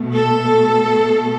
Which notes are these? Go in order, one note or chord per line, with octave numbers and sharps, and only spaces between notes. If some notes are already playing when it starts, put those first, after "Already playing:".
Already playing: B2 A3
A4